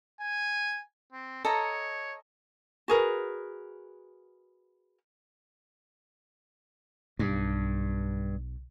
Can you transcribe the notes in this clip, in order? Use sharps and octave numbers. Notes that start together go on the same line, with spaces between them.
G#5
C4
A4 C#5 D#5 A#5
F#4 G#4 A#4 B4
B1 G2